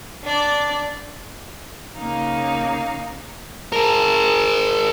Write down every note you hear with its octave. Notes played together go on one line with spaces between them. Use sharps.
D4 D5
C#3 A#3 D#4 F5
G#4 A#4